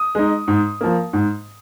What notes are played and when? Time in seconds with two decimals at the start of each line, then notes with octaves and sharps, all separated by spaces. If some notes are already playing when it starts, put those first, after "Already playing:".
Already playing: D#6
0.15 G#3 D#4
0.48 G#2
0.81 F3 A#3
1.13 G#2